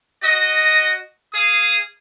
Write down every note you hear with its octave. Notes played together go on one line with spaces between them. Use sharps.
F#4 D#5
G#4 F5 D#6